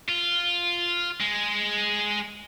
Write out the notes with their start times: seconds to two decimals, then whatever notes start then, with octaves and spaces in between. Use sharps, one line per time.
0.08 F4
1.20 G#3